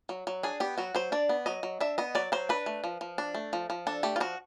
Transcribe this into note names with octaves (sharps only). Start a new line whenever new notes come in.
F#3
F#3
D4 G#4
B3 G4
F#3 F#4
F#3 C5
D4 D5
B3
F#3 D#5
F#3
D4 E5
B3 D#5
F#3 D5
F#3 C5
D4 B4
A3
F3
F3
D4
A3
F3
F3
D4 A4
A3 G4
F4
F3 F#4